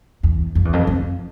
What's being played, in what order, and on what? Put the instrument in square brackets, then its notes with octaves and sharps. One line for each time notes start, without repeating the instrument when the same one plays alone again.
[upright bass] E2
F2
E2
F2
F2